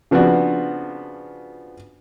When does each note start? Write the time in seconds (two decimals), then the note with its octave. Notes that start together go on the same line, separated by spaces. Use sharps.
0.11 C#3 F3 B3 C4 D4 F#4